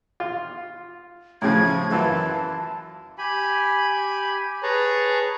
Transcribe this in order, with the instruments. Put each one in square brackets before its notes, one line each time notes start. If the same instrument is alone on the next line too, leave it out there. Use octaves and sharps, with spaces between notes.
[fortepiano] F4
[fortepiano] A2 C#3 F3 [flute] G#6
[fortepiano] F#2 E3 F4 [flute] A5
[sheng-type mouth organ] G4 G#5 B5
G#4 B4 C#5 A5 A#5